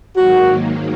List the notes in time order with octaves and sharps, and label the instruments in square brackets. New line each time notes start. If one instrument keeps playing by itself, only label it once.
[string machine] G#2 D#3 F#3 A#3 [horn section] F#4